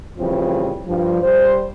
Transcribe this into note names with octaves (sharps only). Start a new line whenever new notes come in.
A2 C#3 E3 F3 G3 C4
G2 F3
G3 C5